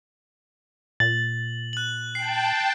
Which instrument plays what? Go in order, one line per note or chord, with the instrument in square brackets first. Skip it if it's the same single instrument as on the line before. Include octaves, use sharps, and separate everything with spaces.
[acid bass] A#2 [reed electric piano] A6 [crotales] F#7
[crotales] F#6 F#7
[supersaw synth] G5 A5 [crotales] C7